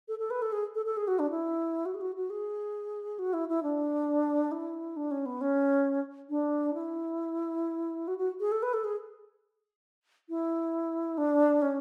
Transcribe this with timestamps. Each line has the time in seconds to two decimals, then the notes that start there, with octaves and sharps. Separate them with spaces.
0.08 A4
0.19 A4
0.30 B4
0.42 A4
0.52 G#4
0.75 A4
0.86 A4
0.97 G#4
1.08 F#4
1.19 D4
1.30 E4
1.86 F#4
1.94 G#4
2.01 F#4
2.16 F#4
2.30 G#4
3.19 F#4
3.33 E4
3.49 E4
3.63 D4
4.52 E4
4.96 D4
5.11 C#4
5.26 B3
5.41 C#4
6.30 D4
6.74 E4
8.08 F#4
8.18 F#4
8.40 G#4
8.52 A4
8.63 B4
8.73 A4
8.84 G#4
10.29 E4
11.18 D4
11.62 C#4